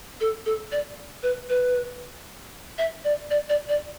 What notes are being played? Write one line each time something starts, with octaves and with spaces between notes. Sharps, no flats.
A4
A4
D5
B4
B4
E5
D5
D5
D5
D5